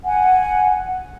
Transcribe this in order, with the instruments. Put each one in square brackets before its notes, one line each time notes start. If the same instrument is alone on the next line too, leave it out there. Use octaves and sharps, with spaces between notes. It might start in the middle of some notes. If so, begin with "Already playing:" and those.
[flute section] F#5 G#5